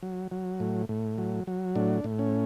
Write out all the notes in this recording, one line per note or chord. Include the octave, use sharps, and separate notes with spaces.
F#3
F#3
A2
A2
F#3
F#3
A2 D4
A2
C#4